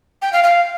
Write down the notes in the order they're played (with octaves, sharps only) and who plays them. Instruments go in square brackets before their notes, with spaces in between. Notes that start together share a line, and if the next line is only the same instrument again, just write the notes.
[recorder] G5
F5
F5